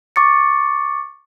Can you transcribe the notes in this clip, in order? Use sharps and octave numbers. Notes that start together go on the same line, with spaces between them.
C#6 D6 A6 C#7